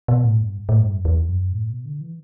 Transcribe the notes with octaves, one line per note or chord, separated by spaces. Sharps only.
B2
A2
G2
A2
G2
F#2
E2
F#2
A2
B2
D3
E3